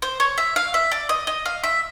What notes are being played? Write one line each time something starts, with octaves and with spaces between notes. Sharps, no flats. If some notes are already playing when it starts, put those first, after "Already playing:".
C5
C#5
E5
F5
E5
D5
D#5
D#5
F5
E5